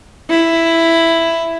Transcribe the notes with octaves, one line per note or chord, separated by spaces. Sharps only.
E4